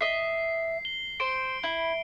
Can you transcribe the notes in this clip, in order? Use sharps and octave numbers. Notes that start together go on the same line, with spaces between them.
D#5 E5 C7
G7
C5 D7
E4